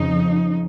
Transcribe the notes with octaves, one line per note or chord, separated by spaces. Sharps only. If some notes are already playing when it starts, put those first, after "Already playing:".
Already playing: F2 C#3 F3 D#4